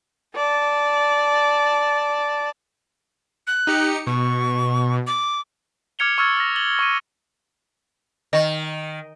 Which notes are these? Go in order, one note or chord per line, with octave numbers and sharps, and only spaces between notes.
D5 A5
F#6
D#4 G4 C#7
B2 C#6
D6
D6 F6 G#6 C#7 F7 G7
C#6 E6 F6 G#6 A6
F6 A#6
A6 F#7 G7
C#6 D6 D#7
D#3 D#5